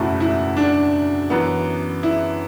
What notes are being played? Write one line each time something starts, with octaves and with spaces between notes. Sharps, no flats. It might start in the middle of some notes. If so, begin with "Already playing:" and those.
Already playing: F#1 E2 B2 A3 E4
E4
D4
F#2 E3 B3
E4